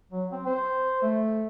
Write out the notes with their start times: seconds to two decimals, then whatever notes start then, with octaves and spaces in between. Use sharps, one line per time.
0.12 F#3
0.32 C4
0.46 C5
1.03 A3